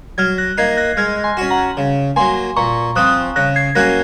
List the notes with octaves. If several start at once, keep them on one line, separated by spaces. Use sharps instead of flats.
F#3 F6 G#6
F#6 A#6
A#3 D#4 G#6 C7
F#6 A#6
G#3 F6 G#6
G#5 C6
C#4 F#4
F#5 A#5
C#3
F#3 A#3 G#5 C6
A#2 A#5 C#6
F3 C4 D#6 F#6
C#3 F#6 A#6
G#6 C7
F#3 A#3 C#4 G#4 F#6 A#6